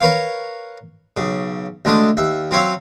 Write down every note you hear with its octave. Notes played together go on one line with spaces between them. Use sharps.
A#4 B4 C#5 F5
B1 C#3
D2 G#3 A3 D4 D#5
D#2 E5
F#3 C4 C#4 C#5 E5 F5